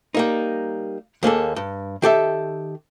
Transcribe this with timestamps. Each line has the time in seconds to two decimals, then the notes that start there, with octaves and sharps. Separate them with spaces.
0.15 G3 A#3 D#4
1.23 D#2 A#3 G#4 A4
1.56 G2
2.02 D#3 G4 A4 E5